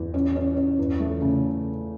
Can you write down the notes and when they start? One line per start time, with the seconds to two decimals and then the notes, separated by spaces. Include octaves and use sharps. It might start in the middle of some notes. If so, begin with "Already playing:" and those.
Already playing: E2
0.14 C#4
0.36 C#4
0.57 C#4
0.79 E2
1.00 A3
1.21 C#3